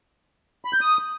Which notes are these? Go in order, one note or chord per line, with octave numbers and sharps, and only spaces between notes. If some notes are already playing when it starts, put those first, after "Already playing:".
B5
G6
D#6